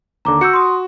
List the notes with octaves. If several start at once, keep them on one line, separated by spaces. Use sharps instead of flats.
D#2 D3 A#5 D6
F#4 E6 G6 C#7
C6 D#6